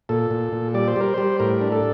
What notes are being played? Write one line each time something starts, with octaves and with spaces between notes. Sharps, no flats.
A#2 A4
A#2
A#2
G3 D5
C5
G3 A#4
G3 C5
A2 A#4
D4
A4